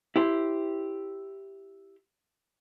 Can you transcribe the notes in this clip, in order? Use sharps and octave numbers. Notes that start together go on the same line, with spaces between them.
E4 G4 C5